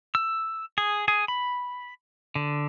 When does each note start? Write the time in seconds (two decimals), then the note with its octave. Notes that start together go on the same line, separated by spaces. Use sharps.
0.15 E6
0.78 G#4
1.08 G#4
1.28 B5
2.35 D3